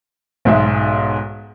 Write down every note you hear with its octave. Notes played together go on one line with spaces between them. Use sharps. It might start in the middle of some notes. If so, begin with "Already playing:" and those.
B1 G#2 G#3 E5